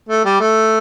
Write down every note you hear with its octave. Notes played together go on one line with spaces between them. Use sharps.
A3
G3
A3